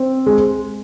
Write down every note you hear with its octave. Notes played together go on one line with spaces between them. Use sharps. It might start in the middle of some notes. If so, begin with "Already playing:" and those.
Already playing: C4
G#3